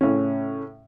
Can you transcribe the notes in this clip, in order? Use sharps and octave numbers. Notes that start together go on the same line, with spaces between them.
A2 C#3 C#4